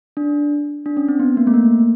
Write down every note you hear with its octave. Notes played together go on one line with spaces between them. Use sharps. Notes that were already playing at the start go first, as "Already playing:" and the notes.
D4
D4
C#4
C4
B3
A#3
A3
A#3